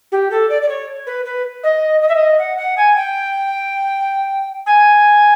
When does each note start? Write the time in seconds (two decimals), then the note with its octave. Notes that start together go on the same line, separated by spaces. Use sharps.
0.11 G4
0.30 A4
0.49 D5
0.62 D5
0.68 C#5
1.06 B4
1.25 B4
1.63 D#5
2.01 D#5
2.08 E5
2.15 D#5
2.38 F#5
2.57 F#5
2.77 G#5
2.96 G5
4.66 G#5